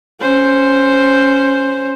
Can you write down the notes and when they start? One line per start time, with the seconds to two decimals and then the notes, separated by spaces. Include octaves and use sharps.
0.21 C#4 C5